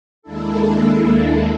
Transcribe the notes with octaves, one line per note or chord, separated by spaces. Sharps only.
D#2 G#3 A#3 D4 E4 A4